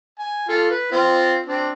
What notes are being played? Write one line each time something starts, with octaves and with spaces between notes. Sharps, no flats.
G#5
F4 A4
B4
C4 F4
C4 D4